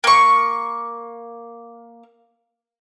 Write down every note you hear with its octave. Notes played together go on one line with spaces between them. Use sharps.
A#3 C#6